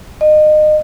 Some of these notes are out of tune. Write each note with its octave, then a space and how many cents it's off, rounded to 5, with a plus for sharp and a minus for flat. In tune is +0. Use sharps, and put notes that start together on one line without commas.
D#5 -30